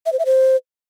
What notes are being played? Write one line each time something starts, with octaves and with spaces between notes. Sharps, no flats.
E5
C5
E5
C5